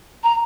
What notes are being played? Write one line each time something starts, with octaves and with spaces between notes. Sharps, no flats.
A#5